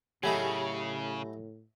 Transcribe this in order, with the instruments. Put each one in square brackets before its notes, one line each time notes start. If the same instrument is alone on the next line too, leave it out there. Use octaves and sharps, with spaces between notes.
[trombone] A2 [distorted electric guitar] C#3 [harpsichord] F#3 A3 D#4 [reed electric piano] G4 G#5 B5